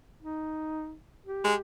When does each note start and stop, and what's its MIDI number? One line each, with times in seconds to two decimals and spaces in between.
0.22 0.94 63
1.26 1.61 67
1.44 1.55 56